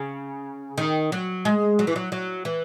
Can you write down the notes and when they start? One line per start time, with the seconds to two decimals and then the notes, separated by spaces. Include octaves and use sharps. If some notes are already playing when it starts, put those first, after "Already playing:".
Already playing: C#3
0.78 D#3
1.12 F#3
1.45 G#3
1.79 F#3
1.87 E3
1.96 F#3
2.12 F#3
2.45 E3